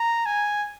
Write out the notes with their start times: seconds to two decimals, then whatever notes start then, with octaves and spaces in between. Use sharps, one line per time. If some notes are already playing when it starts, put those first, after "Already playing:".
Already playing: A#5
0.26 G#5